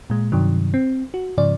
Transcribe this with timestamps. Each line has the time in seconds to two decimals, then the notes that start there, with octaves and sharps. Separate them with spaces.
0.10 A#2 G#3
0.32 G2 C3 D#3 F#3
0.74 C4
1.14 F#4
1.38 G#2 C#3 F3 D5